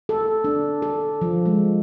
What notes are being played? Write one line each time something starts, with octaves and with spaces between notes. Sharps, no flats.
A4
D4
A4
F3
G#3